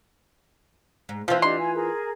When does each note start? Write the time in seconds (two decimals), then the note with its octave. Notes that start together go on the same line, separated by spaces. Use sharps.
1.09 G#2
1.28 E3 F3 C4 F4
1.42 D4 G4 D#5 C6
1.59 G#5
1.74 G#4 A#4